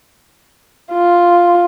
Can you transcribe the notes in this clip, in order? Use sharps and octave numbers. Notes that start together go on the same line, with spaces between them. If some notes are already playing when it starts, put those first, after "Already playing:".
F4